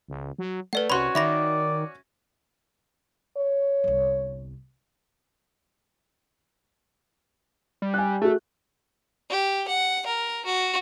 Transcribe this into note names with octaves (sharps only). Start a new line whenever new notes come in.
C#2
F#3
A3 B4 D5 F#5
C2 C#4 F#4 C#5 B5 C6
D#3 D5 E5 B5 A#6
C#5
G1 C2
G3
G#5 F#6
A3 F#4 G#4
G4
F#5
A#4
F#4